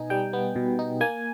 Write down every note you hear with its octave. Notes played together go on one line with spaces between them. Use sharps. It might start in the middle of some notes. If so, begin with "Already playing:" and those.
Already playing: B2 B3 D#4 G#5
G3 G5
B3
B2
D#4
A#3 G#5